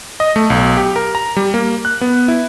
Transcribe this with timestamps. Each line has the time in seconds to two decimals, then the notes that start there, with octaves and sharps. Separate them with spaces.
0.20 D#5
0.36 A3
0.50 B1
0.77 G4
0.96 A#4
1.15 A#5
1.37 G3
1.54 A#3
1.85 F#6
2.01 B3
2.28 E4